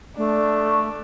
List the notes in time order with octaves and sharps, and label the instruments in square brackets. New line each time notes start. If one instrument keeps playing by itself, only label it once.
[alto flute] A3 [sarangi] D4